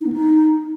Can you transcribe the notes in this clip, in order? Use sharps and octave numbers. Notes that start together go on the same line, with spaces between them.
D#4
B3
D#4